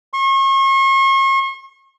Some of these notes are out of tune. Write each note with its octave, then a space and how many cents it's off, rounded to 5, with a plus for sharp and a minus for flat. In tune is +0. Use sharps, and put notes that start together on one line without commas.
C#6 -40